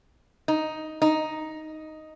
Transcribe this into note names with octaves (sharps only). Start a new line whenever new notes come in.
D#4
D#4